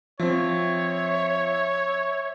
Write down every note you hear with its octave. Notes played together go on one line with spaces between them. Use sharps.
F3 C4 C#5 E5